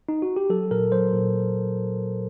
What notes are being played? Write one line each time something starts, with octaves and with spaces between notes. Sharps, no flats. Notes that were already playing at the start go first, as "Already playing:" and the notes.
D#4
F#4
G4
F#3 A4
A#2 A#4
F#3 C5
A#2